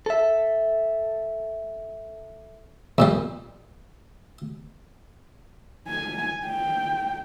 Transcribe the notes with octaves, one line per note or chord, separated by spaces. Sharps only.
A4 E5
F2 A#2 G3
G#5
G5